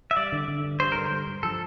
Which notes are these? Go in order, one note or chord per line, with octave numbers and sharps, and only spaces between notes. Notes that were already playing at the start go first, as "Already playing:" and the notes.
E5
G3 D5
D3
D3
G2
G2 C5
D3 A#4
C5
G3
G2
F3 A4